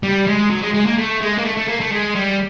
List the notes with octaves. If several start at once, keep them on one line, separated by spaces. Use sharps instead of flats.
G3
G#3
F#3
G#3
G#3
A#3
A3
G#3
A#3
A3
A3
A#3
A3
G#3
G3